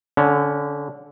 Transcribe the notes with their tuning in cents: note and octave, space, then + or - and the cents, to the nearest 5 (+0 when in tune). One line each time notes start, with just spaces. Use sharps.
D3 -20 C#4 +0